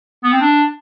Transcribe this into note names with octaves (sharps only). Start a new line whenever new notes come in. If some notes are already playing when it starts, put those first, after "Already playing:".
B3
C4
D4